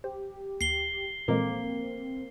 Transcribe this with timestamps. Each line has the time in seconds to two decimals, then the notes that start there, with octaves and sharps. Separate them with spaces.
0.04 G4 C5
0.61 D#2 C7 G7
1.28 A#2 E3 G#3 A#3 C4